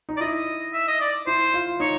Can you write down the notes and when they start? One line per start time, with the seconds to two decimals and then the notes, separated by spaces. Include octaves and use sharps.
0.09 D#4
0.17 D5
0.21 E4 D#5
0.73 E5
0.88 D#5
1.01 D5
1.27 E4 C5
1.54 F4
1.80 D#4 C#5